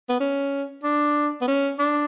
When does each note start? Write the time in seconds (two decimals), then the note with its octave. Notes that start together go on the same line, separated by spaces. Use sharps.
0.09 B3
0.20 C#4
0.84 D4
1.41 B3
1.48 C#4
1.79 D4